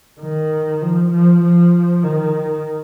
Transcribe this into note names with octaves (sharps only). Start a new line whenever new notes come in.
D#3
F3
F3
F3
D#3